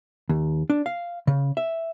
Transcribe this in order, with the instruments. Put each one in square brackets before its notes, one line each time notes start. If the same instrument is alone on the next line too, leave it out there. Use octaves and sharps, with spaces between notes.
[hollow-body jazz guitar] D#2
D4
F5
C#3
E5